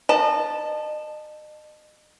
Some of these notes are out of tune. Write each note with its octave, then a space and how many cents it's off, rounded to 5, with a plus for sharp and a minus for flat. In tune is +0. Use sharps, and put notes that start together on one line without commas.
D#5 -35 A5 +0